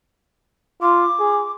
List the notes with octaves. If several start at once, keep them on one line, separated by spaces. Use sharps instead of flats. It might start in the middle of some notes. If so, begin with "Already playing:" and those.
F4 D6
G#4